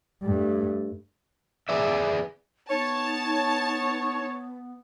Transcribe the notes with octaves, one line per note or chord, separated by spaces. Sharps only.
G2 A3
G#4 B4 D5 E5
B3 D#4 C#5 A5